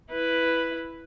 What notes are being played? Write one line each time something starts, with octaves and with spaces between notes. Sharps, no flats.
E4 B4